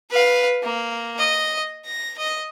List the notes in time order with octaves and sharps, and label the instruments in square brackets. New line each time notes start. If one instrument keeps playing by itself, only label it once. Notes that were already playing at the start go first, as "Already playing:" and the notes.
[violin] B4 F5
A#3
D#5
A#6
D#5